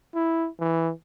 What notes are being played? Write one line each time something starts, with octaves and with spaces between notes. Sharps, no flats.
E4
E3